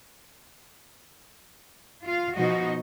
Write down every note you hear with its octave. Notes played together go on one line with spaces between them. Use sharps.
F4 F5
B2 F3 D#4 F#4 D#5